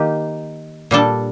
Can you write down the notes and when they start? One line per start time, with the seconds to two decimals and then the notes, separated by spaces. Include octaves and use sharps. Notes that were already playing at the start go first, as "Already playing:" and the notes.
Already playing: D#3 A#3 D#4 G4
0.91 A#2 G3 D4 A4